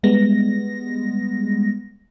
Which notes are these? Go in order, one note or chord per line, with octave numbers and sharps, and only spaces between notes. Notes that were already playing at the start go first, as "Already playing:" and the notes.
G3 G#3 B3 A#6